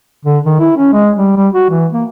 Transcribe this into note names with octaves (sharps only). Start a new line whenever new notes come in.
D3
D#3
E4
C#4
G#3
G3
G3
F#4
E3
A#3